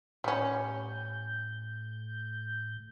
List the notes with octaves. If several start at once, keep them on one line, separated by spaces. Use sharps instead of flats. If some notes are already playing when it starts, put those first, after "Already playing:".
A2 G3 C#4 G6